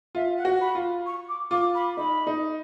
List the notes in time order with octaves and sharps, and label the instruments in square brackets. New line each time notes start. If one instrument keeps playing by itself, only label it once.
[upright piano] F4 [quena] E5
[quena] F#5
[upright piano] F#4
[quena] B5
[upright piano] F4
[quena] C#6
D6
[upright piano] F4 [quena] D6
[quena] B5
[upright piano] D#4 [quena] B5
[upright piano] D#4